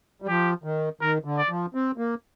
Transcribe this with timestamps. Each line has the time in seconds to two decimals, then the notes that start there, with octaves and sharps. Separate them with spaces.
0.22 G3
0.28 F3 G4
0.64 D#3
1.01 D#3 A#4
1.25 D3
1.38 D5
1.49 F3
1.74 C4
1.98 A#3